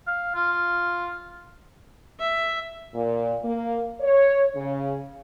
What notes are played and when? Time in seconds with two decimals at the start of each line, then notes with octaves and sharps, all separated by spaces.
0.07 F5
0.35 F4
2.20 E5
2.94 A#2
3.43 A#3
4.01 C#5
4.55 C#3